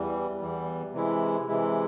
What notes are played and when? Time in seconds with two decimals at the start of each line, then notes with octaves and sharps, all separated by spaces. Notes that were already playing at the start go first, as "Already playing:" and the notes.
Already playing: E2 E3 G3
0.39 E2 E3 G3
0.93 C3 E3 G#3 E4
1.48 C3 E3 G#3 E4